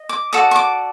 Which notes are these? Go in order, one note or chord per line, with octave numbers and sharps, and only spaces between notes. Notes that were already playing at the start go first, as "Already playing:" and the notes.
Already playing: D#5
D6
F#4 A4 D5 D#6
C#6
D6